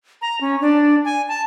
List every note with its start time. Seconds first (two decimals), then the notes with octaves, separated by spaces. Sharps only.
0.22 A#5
0.41 C#4
0.61 D4
1.05 G#5
1.28 A5